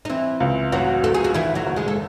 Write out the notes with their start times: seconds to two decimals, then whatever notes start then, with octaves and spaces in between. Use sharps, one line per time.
0.05 D#4
0.09 E3 C4 E4
0.40 C#2
0.72 A1 F#3 F#4
1.03 A1 A4
1.14 G#4
1.24 F#4
1.34 D#3 E3 E4
1.55 F#3 F#4
1.66 F#1
1.76 G#3 G#4
1.88 A4